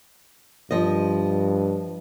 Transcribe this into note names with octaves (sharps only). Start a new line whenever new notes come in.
G2 F3 D#5